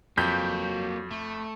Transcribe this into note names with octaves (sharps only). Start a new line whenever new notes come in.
F2 F#3 A#3 F#4 G6 B6
A3